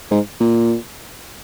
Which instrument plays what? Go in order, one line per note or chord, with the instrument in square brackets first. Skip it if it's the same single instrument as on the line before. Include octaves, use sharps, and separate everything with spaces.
[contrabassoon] G#2
A#2